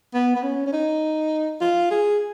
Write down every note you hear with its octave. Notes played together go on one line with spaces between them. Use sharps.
B3
B3
C#4
C#4
D#4
F4
G#4